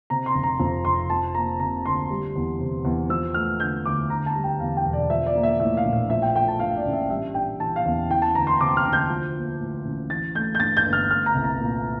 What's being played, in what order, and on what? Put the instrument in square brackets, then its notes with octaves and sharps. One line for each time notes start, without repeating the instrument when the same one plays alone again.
[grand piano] C3 A#5
C6
F1
A#5
F2
F1 C6
F3 A5
A#3 A#5
C3 A#5
D2 C6
G3
E2
C3
E2
F3 E6
A3 F6
D3 G6
D2 D6
D3 A#5
A5
G3
G5
E2 F5
G5
E1
D5
F3 E5
D5
A#3
E5
A2 E5
F5
A#1
F5
F3 E5
G5
A3 G5
A5
G2 F5
D5
A1
E5
G3 E5
D4 G5
E3 A5
F5
E2
E3 G5
A5
D2 A#5
C6
C3 D6
F6
D2
G6
F3
A#3
A2
A1
E3 A6
A3 G6
G6
G2 A6
G6
G1
F6
A3 F6
A#5
C2
A#5
A#2